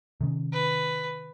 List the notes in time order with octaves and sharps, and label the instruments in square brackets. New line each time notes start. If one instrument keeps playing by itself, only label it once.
[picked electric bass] C3 D#3 C#4
[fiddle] B4